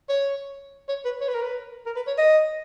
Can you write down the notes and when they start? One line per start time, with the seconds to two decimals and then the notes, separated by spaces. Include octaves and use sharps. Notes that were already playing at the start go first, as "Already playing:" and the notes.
0.09 C#5
0.88 C#5
1.05 B4
1.21 C#5
1.28 B4
1.35 A#4
1.42 B4
1.86 A#4
1.96 B4
2.07 C#5
2.18 D#5